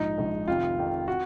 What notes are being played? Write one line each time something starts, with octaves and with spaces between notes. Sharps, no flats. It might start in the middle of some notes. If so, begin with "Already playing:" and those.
Already playing: A#1 G#2 F3 D#4
A#1 G#2 F3
F1 F2 D#3 F4
F1 F2 D#3
F#4